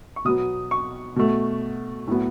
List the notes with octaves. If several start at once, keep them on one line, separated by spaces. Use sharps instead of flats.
C#6
B2 F#3 B3 D#6
C#6
B2 A3
A2 F#3 B3